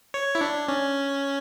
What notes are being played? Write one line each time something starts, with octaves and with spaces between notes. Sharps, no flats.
C#5
E4
D4
C#4